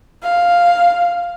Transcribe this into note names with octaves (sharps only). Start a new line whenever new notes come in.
F5